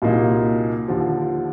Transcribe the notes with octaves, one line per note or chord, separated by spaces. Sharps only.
C2 A#2 F#3 A#3 D#4
D#2 D3 F3